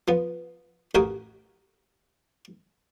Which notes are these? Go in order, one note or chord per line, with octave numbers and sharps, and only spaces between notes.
F3 B3
A1 F#4 G4 A#4 G#5 D#6